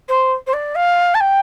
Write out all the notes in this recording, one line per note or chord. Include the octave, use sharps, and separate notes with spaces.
C5
C5
D5
F5
A5
G5